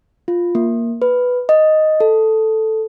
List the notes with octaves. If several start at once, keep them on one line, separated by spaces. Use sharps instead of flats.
F4
A#3
B4
D#5
A4